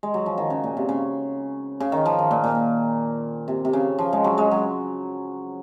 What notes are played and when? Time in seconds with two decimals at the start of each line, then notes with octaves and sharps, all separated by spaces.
0.03 G#3
0.14 F#3
0.26 F3
0.38 D#3
0.50 C#3
0.64 A#2
0.77 C3
0.89 C#3
1.80 C#3
1.92 D#3
2.06 F3
2.19 D#3
2.31 A#2
2.44 A#2
3.48 C3
3.65 C3
3.73 C#3
3.99 F3
4.13 G#3
4.24 F#3
4.38 G#3
4.51 F#3